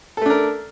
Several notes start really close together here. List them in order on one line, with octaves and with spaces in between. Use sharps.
A4 A3 D4 A#4